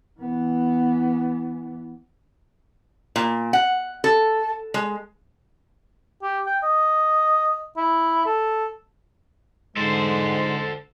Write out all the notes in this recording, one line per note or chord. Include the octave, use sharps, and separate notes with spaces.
E3 B3
A#2
F#5
A4
G#3
G4
G5
D#5
E4
A4
G#2 D3 G#3 A4 C5